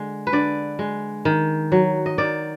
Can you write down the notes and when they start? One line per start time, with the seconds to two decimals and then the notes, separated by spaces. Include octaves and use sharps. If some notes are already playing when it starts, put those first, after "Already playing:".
Already playing: D3 G#3
0.27 B4
0.33 D3 D5
0.79 G#3
1.25 D#3
1.72 F#3
2.06 D#5
2.18 D#3 D5